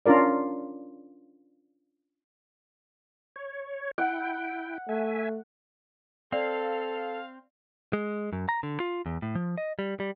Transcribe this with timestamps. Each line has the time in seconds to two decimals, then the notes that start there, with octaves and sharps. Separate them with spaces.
0.06 C#4 D4 F4 A#4 D5
3.36 C#5
3.98 E4 F#5 G5
4.89 A3 E5 G#5
6.32 C4 A4 D5 F5
7.93 G#3
8.33 F#2
8.49 A#5
8.63 D3
8.80 F4
9.06 E2
9.22 A2
9.35 F3
9.58 D#5
9.79 G3
10.00 G3